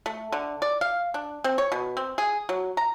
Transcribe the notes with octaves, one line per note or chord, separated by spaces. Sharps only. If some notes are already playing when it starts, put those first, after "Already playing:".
A3
D3
D5
F5
D4
C4
C#5
B2
C4
G#4
F#3
A#5